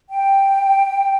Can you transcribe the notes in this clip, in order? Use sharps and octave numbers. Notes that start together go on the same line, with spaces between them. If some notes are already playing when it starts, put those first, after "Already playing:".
G5